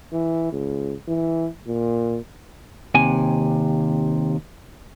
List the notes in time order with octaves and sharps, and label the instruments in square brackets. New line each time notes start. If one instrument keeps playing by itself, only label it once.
[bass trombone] E3
C#2
E3
A#2
[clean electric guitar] D#2 C3 G#5